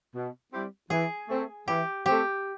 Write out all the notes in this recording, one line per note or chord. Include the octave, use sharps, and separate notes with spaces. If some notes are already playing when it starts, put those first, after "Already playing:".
B2
G3 C4 E4 G4
E3 G#4
A3 C4
E3 G4
A3 C4 G4